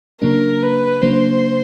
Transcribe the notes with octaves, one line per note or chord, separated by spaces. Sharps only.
C#3 F#3 A#3 D4 A#4
B4
C#3 F#3 A#3 D4 C5